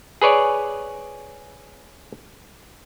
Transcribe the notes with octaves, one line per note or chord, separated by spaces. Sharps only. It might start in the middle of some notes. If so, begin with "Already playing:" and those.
G#4 B4 C#5 D5